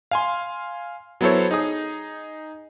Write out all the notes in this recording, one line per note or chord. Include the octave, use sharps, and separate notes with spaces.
F5 G#5 C6
F#3 B3 E4 A4 C5 C#5
D#4 G#4 D#6